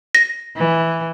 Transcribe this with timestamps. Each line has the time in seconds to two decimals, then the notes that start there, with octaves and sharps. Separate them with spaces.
0.15 A#6
0.57 E3